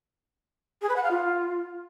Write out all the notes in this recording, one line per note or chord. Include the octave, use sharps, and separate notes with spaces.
G#4
B4
F#5
F5
F4